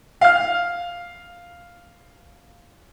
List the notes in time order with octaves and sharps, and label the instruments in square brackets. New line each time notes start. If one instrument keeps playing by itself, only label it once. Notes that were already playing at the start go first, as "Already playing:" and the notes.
[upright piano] F5 F6